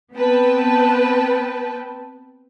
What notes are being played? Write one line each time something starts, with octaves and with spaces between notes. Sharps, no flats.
B3 C4 B4 G5 A5